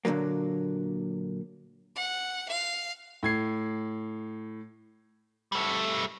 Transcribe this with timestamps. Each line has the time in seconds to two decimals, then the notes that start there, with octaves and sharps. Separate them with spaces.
0.05 A#2 D3 E3 F#3 A#3
1.96 F#5
2.48 F5
3.23 A2 G#6 C7
5.52 G3 A3